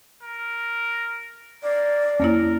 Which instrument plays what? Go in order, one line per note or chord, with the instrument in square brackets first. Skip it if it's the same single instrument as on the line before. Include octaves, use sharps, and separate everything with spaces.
[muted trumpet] A#4
[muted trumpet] A#3 [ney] D5
[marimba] F2 A#3 E4 [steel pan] C#4 [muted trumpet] A#4